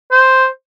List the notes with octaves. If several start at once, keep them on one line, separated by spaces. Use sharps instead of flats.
C5